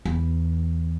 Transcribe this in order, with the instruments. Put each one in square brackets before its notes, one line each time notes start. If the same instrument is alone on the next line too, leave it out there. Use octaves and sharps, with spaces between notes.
[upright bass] E2